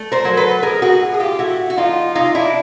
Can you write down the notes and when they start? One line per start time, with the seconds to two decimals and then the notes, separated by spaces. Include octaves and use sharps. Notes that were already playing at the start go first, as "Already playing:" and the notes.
Already playing: A3
0.12 A#4 C5
0.25 F#3
0.37 A4 B4
0.63 A2 G#4 A#4
0.82 F#4 G#4
1.01 A2
1.14 G#4
1.20 F4 G4
1.39 A3 E4 F#4
1.70 F#4
1.77 F3 D#4 F4
2.15 C3 D#4 F4
2.35 D4 E4